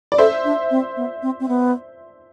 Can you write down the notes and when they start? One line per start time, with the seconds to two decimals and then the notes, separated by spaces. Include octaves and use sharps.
0.12 D5
0.18 A4 C5 E5
0.45 D4
0.71 C4
0.96 B3
1.22 C4
1.40 C4
1.48 B3